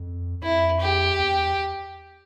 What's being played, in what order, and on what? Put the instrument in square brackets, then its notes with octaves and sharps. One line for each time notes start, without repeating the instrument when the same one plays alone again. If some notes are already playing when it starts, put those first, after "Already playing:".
Already playing: [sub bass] F2
[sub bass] F2 [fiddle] E4
[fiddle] G4
[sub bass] E2